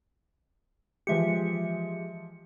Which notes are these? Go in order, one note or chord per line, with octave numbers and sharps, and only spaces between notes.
E3 F3 G#3 G4 E5 C#7